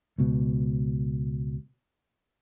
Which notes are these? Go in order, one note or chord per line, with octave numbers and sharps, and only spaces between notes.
C#2 B2